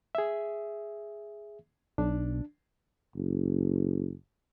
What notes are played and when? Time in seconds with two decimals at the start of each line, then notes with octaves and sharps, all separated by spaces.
0.15 G#4 E5
1.98 B1 D4
3.15 F#1